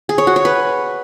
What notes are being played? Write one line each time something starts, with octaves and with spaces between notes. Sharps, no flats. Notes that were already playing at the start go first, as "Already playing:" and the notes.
G#4
C#5
F#4
C#5
B4